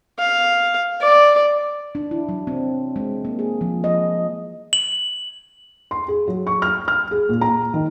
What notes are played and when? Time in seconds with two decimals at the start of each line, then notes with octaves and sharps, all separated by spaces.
0.19 F5
1.01 D5
1.95 D4
2.11 E4
2.29 F#3
2.47 C4
2.96 G#3
3.25 A#3
3.39 G#4
3.61 F3
3.84 D#5
4.73 F#7
5.91 C6
6.08 G#4
6.28 F#3
6.47 C#6
6.62 F6
6.88 F6
7.11 G#4
7.29 A#2
7.41 A#5
7.74 D#3